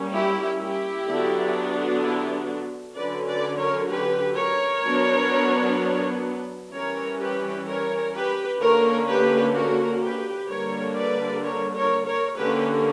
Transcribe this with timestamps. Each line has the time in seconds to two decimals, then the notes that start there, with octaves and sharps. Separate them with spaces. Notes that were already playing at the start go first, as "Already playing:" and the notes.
Already playing: G3 A#3 C#4
0.13 E4 G4
0.60 E4 G4
1.07 D3 F#3 B3 D4
2.02 E4 G4
2.95 D3 F#3 C#4 B4 D5
3.27 B4 D5
3.59 A#4 C#5
3.90 G4 B4
4.37 A#4 C#5
4.85 F#3 B3 D4
6.72 E3 G3 C#4 A#4 C#5
7.19 G4 B4
7.66 A#4 C#5
8.14 G4 B4
8.61 D3 A#3 C#4 A#4 C#5
9.08 G4 B4
9.55 F#4 A#4
10.02 G4 B4
10.49 D3 G3 A#3 D4 A#4 C#5
10.97 B4 D5
11.43 A#4 C#5
11.75 A#4 C#5
12.06 A#4 C#5
12.37 D3 A#3 C#4 G4 B4